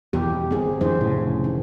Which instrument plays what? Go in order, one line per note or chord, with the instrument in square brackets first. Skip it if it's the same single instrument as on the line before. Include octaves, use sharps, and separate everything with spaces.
[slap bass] E2 B2 E3 [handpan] G4
[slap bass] G1 [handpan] C4 G#4
[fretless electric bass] F#2 E3 [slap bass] D4 [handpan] C5
[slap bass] F1 E3 [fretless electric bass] A2 C#3
[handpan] D#3